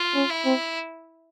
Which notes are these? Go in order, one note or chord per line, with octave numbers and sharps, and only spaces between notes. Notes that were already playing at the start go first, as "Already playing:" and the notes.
Already playing: F4
C#4
E4
C4